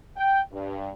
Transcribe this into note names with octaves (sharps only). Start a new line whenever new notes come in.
G5
G2